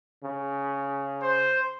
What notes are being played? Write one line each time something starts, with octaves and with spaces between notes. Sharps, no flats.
C#3
C5